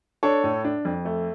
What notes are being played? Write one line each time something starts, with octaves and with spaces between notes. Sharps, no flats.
D4 A4 C#5
A2
D4
F2
A3